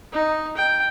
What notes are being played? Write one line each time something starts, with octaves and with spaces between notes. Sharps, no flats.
D#4
G5